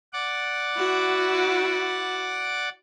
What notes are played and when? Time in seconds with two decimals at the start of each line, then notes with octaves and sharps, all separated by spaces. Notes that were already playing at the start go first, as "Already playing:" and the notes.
0.13 D5 F#5 D6
0.76 E4 F#4